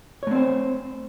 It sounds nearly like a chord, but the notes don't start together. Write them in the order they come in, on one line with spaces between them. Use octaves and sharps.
C#5 A3 C4 C5